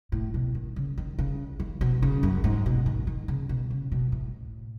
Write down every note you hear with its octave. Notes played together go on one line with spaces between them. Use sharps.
A2
B2
D#3
C#3
D#3
C#3
D#3
B2
C#3
F#2
G#2
B2
D#3
D#3
C#3
B2
C#3
B2
A2